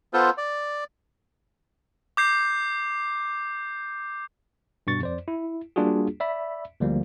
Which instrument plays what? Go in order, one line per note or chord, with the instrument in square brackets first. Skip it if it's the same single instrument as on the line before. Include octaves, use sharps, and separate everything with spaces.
[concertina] B3 F4 A4 C5
D5
[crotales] D6 G6 C7
[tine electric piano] G2 B2 C#6 A6
F2 C5 D5
E4
G3 A#3 D4 F4 F#4 G#4
D5 E5 B5
D2 F3 G3 A#3